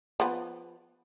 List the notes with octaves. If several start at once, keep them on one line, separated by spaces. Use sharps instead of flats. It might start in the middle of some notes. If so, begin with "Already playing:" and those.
F3 B3